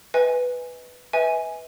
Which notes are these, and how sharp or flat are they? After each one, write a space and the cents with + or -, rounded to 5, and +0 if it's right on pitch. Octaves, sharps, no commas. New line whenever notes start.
B4 +5 D#5 +40 G#5 -5
B4 +0 E5 -35 G#5 +0